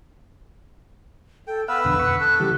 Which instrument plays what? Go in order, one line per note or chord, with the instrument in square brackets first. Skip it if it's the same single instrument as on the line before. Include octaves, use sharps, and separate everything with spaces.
[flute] A4 [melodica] G5
[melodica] B3 B4 E6 [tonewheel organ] F5 F#5 [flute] B5
[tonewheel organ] F2 B2 D3
[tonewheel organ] B5 C#6 [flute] F#6
[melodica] A4 [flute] F#6
[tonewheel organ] C#3 E3 G3 [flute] G4